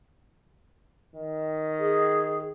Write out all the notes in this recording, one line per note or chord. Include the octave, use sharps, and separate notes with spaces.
D#3
G#4